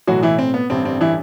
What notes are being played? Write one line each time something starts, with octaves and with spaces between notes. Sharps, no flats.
B1 A2 E3 F#3 F#4
E3 E4
C4
B3
A1 G2 D3 C4
C4
E3 E4